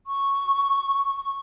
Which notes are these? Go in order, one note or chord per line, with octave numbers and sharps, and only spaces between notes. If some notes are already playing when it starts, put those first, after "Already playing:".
C#6